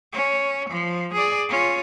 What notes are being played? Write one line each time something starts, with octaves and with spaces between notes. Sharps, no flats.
C#4
F3
G#4 D5
C#4 F4